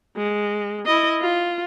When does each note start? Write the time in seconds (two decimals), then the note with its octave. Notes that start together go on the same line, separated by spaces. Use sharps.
0.17 G#3
0.86 E4 D#5
1.21 F4